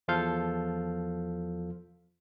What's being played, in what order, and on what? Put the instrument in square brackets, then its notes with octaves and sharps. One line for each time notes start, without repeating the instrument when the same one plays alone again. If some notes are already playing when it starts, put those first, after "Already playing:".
[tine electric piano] E2 F3 F4 A4 F5 G6